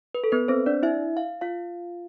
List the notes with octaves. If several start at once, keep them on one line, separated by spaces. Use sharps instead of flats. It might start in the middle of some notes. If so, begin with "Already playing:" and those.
B4
A4
B3 B4
C4 C5
D4 D5
E4 E5
F5
F4 F5